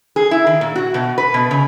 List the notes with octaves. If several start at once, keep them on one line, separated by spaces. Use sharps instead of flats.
G#4
E4
D#3
A#2
F#4
B2
B4
B2
C#3